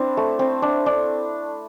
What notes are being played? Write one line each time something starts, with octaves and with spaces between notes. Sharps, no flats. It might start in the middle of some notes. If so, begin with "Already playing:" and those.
Already playing: C4 D4 E4
A3
C4
D4
D4